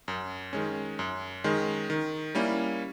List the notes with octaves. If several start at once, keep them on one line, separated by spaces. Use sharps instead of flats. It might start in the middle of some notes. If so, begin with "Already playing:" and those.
F#2
D#3 G#3 C#4
F#2
D#3 G#3 C#4
D#3
G3 A#3 C#4 E4